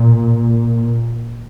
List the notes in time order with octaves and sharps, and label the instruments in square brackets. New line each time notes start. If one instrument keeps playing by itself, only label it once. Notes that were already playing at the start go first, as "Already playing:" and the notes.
Already playing: [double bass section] A#2